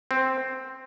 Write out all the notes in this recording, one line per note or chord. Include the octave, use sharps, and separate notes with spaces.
C4